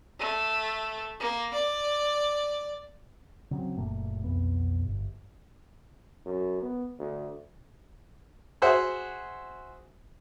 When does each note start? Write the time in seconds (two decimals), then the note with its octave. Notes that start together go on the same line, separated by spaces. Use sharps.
0.19 A3
1.20 A#3
1.54 D5
3.51 C#3 F#3 C4
3.76 F#1 A#2 A3 A#3
4.24 B1 F2 B3
4.85 G1
6.26 F#2
6.62 B3
7.00 D2
8.62 F#4 G#4 C5 E5 F#5